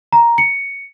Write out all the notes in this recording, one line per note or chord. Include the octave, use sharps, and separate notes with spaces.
A#5
C#7